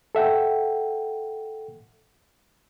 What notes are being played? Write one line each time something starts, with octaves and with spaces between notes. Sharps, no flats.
A4 E5 F#5 G5